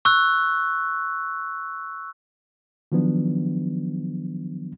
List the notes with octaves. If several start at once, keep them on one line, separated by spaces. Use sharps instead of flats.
C#6 E6 F#6
D#3 F3 F#3 B3 D4